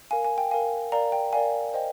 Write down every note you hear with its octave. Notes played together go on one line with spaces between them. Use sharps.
A#4 F5 G#5
G#5
G5
A#4 F5 G#5
A#4 D5 F5 A#5
G5
A#4 D5 F5 G#5
C5 D#5 G5